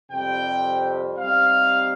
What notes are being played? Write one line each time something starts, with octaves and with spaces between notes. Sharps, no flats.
F2 C3 G3 G5
C3 G3 C4 D#4 F5